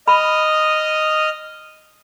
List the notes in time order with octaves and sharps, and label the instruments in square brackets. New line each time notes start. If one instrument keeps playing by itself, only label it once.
[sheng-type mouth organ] D#5 D#6 F6 [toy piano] B5